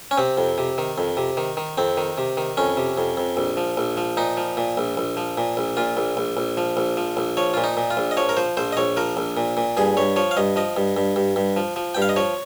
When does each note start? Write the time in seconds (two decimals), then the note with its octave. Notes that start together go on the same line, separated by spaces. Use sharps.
0.11 C#4
0.18 C3 C4
0.37 F2
0.58 C3
0.78 D#3
0.98 F2
1.17 C3
1.37 D#3
1.57 D#3
1.78 F2 C4
1.97 D#3
2.18 C3
2.37 D#3
2.57 F2 C#4
2.77 C3
2.98 F2
3.17 F2
3.37 A#1
3.57 F3
3.77 A#1
3.97 F3
4.17 A#2 D#4
4.37 F3
4.57 A#2
4.77 A#1
4.97 A#1
5.17 F3
5.38 A#2
5.57 A#1
5.77 A#2 F4
5.97 A#1
6.17 A#1
6.37 A#1
6.57 F3
6.77 A#1
6.97 F3
7.17 A#1
7.37 F3 C#5
7.54 A#2 F4
7.64 D#4
7.77 A#2
7.91 F4
7.97 A#1
8.11 D#5
8.17 F3 C#5
8.29 A#4
8.37 F3 C5
8.57 A#1 C5
8.73 D#5
8.77 A#1 C#5
8.97 F3 A#4
9.17 A#1
9.37 A#2
9.57 A#2
9.77 G2 G#4
9.97 G2 C#5
10.16 F3 C#5
10.31 F5
10.37 G2 D#5
10.56 F3 D#5
10.76 G2
10.97 G2
11.16 G2
11.36 G2
11.56 F3
11.76 F3
11.95 G2 G5
12.02 F5
12.09 D#5
12.16 F3 C#5